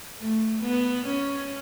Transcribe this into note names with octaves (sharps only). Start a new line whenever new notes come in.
A3
B3
C#4